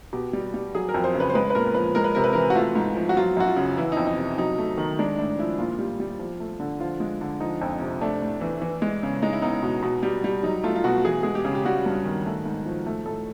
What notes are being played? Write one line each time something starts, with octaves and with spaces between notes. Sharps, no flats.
B2 G4
G3
G3
F#3 G#4
A#4
F2
C5
C#3
B4
C5
G#3 B4
B4
A#2 A#4
F3 B4
G#3 A#4
B4
C3 A#4
B4
E3 A#4
F#4
A3 F4
G#2
F3
F#4
F#3 F4
F#2 F#4
F4
C#3
E3 E4
F2 D#4
D#4
C3
F#3 D#4
A3
D#3
G#3 D4
A2 D4
F3 E4
A#2 F4
G3
G3
F3
A3
D3
F3 F4
G#3
D3
F3 D#4
F2
C3
A3 D4
A2
E3
E3
G#3
C#3
G#3 D#4
E4
E2 D#4
B2
B2
G3
G3
F#3 D#4
A3 F4
F4
B2 F#4
E3 G#4
G#3 G#4
G4
C#3
G4
G3 F#4
G2
D#3
A3
G#2
F3
A3
A2 A4